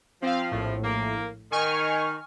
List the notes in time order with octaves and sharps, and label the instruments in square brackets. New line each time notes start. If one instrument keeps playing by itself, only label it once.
[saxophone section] F3 [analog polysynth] C4 F5
[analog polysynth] A#1 A2
[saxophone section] A#3
[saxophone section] D#3 [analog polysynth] G#5 C#6 F6